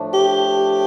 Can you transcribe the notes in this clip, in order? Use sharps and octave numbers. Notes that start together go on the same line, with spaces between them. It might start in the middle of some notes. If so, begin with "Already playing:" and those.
Already playing: A2 F3 A3 D4
G4